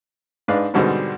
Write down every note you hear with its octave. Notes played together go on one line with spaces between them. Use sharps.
G#2 G#3 D4 B4 F5
G#2 B2 D3 G3 G#3 C4